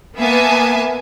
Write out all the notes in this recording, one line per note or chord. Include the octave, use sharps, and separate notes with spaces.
A#3 B3 E5 G#5 A5